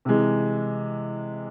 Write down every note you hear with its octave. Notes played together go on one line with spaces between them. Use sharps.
C3 E3 G#3